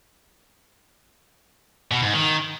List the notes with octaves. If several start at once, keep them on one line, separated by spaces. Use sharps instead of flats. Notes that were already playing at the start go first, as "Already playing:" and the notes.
B2
G#2
D#3